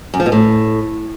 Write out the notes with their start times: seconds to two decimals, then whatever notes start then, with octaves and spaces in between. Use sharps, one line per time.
0.14 F#2
0.20 F3
0.26 B2
0.32 A2